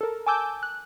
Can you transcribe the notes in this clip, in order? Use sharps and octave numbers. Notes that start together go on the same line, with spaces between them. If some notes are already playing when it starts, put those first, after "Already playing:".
A4 A#4
G#5 A5 D6 E6 G6
F#6